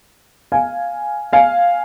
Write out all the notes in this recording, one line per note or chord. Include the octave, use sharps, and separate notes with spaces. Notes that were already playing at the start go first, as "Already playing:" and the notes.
F5 G#5
F5 G#5